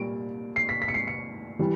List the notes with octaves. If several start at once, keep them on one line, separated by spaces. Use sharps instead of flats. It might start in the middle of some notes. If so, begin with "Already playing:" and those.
Already playing: A#2 G3 D7
C7
B6
B6
C#7
C7
C#7
E3 G3